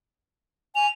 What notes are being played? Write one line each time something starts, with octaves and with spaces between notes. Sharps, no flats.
G#5 F7